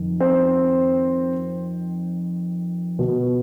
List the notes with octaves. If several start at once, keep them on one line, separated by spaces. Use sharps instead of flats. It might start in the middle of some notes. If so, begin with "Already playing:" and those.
Already playing: F2 D#3
C4 C5
B2